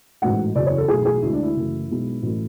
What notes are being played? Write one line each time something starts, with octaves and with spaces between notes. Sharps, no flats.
A1 G#2 F#3 A3 F#5
F#1 E2 C#3 F#3 D5
C#5
A4
B1 A2 E3 G#4
G#4
D2 D3 G#3 E4
D4
E4
F#1 F#2 E3 A3
B1 B2 G#3 B3
A1 F#3 A3